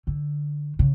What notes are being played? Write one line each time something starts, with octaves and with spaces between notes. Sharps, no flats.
D3
C#3